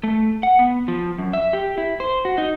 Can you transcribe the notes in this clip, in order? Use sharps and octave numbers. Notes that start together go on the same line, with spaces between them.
A3
F#5
B3
F3
F#2
E5
G4
E4
C5
F#4
D#4